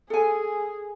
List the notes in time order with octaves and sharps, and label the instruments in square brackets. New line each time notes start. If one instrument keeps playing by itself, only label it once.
[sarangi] G#4 [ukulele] A4 G#5